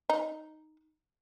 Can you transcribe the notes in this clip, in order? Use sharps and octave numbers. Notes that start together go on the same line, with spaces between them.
D#4